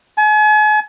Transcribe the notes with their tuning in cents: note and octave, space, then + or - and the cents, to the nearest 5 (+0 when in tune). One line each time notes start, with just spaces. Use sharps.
G#5 +40